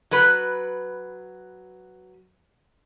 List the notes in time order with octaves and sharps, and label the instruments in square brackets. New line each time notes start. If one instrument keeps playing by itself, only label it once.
[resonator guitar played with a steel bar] F#3 B4